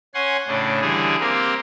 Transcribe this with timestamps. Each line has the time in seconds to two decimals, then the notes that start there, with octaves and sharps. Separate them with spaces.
0.14 C#4 F#5 G#5 C6
0.48 A2 C#3 D4
0.81 D3 E3 G3 G#4
1.20 A#3 C4 G4 A#4